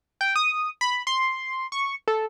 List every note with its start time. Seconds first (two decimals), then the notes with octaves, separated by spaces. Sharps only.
0.21 G5
0.36 D#6
0.81 B5
1.07 C6
1.72 C#6
2.08 A4